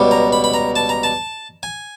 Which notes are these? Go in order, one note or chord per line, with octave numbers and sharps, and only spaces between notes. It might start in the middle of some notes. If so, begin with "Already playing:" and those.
Already playing: C#2 B2 G3
A#5
B5
B5
A#5
A5
A#5
A5
G#5